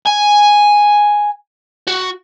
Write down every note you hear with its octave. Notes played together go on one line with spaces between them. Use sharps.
G#5
F#4